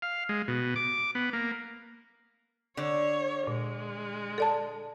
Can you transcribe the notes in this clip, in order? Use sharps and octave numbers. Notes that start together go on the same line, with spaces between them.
F5
G#3
B2
D6
B3
A#3
D3 C#5
A#2 G#3
A4 D5 A5